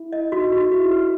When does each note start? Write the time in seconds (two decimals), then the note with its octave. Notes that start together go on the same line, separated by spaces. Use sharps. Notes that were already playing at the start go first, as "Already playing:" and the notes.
Already playing: E4
0.13 D#5
0.32 D#4 F#4
0.52 F#4
0.71 E4 F#4
0.91 B4